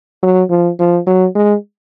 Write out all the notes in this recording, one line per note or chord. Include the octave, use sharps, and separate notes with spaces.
F#3
F3
F3
F#3
G#3